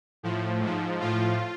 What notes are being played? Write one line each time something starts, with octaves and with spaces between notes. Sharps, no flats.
A2 F3
G#2 F3
A2 F3 F4